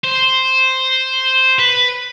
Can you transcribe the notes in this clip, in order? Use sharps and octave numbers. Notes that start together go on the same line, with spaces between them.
C5
B4